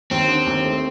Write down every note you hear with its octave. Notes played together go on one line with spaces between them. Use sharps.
D#2 C4
D3
D#2
A3